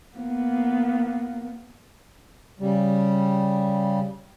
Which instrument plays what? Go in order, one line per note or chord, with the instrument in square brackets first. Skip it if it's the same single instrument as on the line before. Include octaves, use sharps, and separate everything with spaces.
[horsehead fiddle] A#3 B3
[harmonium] C#3 G3